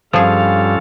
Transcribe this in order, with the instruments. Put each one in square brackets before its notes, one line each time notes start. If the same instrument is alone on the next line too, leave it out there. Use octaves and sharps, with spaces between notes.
[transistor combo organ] G2 [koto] F3 G#4 [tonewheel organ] C#4 F4 A4 [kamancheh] F5